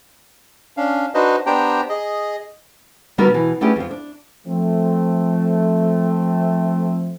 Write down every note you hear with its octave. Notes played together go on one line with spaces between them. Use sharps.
C#4 D4 F5
D4 D#4 F#4 B4 C5 D#5
B3 D4 G4 C5 G5 A#5
G#4 D#5
D3 G3 B3 D#4 F#4 A#4
B2 E3
A3 B3 C#4 D4 G4 G#4
F2 F3
D4
F3 A3 C4